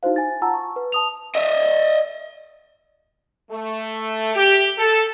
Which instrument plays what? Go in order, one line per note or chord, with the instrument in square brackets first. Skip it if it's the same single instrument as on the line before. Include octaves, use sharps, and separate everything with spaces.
[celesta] D#4 E4 F#4 C5 F5
G#5 A6
F4 F#5 A5 A#5 E6
C#6
B4
A5 D#6 F7
[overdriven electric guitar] D#5 E5
[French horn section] A3
G4
A4